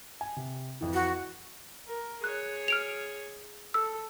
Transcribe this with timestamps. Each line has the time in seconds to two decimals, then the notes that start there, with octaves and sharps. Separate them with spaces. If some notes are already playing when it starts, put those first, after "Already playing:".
0.21 G#5
0.36 C3
0.81 F2 E3
0.94 F#4
1.87 A#4
2.24 G#4 C#5 F#6
2.68 F6 D7 F7
3.74 A4 E6